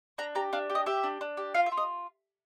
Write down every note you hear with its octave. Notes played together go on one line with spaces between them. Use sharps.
D4 A#5
G4 A#5
D4 F5
G4
D#5
G4 E5
D4
D4
G4
F4 F5
E5
F4
D#5